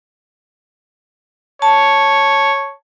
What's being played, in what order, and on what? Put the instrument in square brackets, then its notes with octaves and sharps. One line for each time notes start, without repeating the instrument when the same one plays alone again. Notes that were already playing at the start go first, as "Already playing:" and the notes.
[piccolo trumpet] C#5 [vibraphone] A5